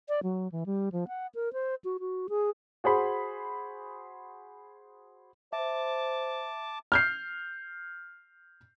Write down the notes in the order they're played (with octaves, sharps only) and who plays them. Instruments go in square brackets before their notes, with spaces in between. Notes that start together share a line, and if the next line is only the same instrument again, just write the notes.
[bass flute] D5
F#3
E3
G3
F3
F#5
A#4
C5
F#4
F#4
G#4
[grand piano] F#4 G#4 C5 B5
[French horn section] C5 [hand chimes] E5 [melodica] A5 D6
[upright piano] F6 G6 C7